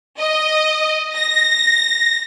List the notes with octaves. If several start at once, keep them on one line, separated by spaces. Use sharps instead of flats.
D#5
A#6